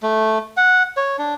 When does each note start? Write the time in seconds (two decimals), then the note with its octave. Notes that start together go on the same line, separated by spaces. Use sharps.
0.03 A3
0.57 F#5
0.97 C#5
1.18 D4